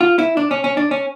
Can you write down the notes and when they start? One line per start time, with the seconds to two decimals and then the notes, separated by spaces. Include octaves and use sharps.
0.01 F4
0.19 E4
0.37 D4
0.51 C#4
0.64 C#4
0.77 D4
0.91 C#4